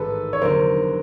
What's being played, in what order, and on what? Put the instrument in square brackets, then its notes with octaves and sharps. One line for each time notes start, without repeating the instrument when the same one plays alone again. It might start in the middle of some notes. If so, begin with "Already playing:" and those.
Already playing: [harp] A1 G#2 D#3 [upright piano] A4 B4
[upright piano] C#5
[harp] F1 D#2 D3 F#3 B3 [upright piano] A#4 C5